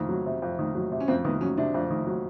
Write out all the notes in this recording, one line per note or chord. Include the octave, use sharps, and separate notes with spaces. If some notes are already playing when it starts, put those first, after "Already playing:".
Already playing: F2 D#3
F#3
C3
F2
D#3
F#3
C3
C#4
F2 C4
D#3 B3
F#3 C#4
C3 D4
F2
D#3
F#3